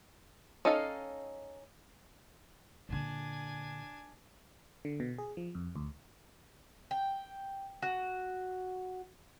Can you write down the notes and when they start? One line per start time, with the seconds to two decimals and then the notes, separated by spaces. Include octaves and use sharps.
0.65 C#4 D#4 A4 D#5 F5
2.89 A#2 D3 D4 G#5
4.85 D3
5.00 B2
5.18 G#4
5.37 F3
5.55 F2
5.76 D2
6.91 G5
7.82 F#4